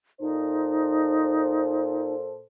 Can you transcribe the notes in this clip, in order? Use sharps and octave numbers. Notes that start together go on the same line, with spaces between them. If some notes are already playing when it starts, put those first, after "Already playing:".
A#2 D#4 A4 C5